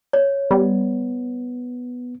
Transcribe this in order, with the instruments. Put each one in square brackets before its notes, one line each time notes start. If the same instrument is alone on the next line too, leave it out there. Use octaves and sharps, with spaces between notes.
[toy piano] C#5
[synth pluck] G3 [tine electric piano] B3